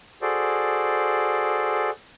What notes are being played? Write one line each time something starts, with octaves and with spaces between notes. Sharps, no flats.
F#4 G#4 A4 C5 D5